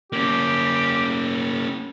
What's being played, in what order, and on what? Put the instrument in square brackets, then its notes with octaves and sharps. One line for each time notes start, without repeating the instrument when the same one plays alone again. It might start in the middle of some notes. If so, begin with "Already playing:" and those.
[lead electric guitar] A#3 C#4 [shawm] G4